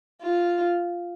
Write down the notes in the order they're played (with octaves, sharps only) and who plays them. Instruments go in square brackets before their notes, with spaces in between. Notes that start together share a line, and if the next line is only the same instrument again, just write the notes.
[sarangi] F4